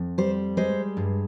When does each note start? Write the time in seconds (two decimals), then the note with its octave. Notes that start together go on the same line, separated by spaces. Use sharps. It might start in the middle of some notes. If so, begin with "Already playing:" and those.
Already playing: F2
0.18 G3 C5
0.57 G#3 C5
0.97 G2